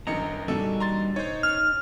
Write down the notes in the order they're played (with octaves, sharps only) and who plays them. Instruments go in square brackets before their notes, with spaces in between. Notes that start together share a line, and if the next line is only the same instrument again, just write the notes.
[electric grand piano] G1 D#5 C#7 [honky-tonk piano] F#2 D#3 D4 [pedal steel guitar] A#5
[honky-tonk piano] E2 A#2 D3 [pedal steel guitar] G3 D#4 F#4 [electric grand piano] A4
[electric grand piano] A#5 C6 A6
[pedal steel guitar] D#4 [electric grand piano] C5 C#5
[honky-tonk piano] C#4 [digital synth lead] F6